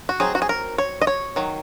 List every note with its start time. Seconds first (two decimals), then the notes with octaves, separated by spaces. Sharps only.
0.09 F#4
0.20 F#3 C4 D#4 G#4
0.35 F#4
0.42 G#4
0.49 A#4
0.78 C#5
1.02 D#5
1.07 C#5
1.36 D#3 F#3